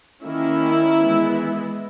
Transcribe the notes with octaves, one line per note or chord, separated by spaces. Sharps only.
D#3 A#3 C#4 E4
E3 G#3 B3